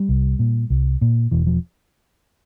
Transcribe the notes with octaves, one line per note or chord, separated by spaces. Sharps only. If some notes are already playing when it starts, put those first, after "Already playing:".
Already playing: G3
C2
A#2
C2
A#2
E1 E3
F3